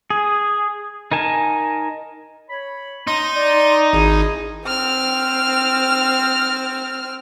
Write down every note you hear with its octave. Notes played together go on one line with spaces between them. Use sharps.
G#4
D#4 A#4 G#5 A5
C#5 B5
D#4 C6
D5
G#1 E4 G#4
C4 F6